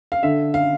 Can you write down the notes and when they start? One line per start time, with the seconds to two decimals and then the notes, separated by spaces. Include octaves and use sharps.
0.12 F5
0.23 D3 E5
0.54 F5